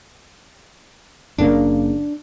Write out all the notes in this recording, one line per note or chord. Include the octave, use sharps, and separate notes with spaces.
F#1 C#3 A#3 D4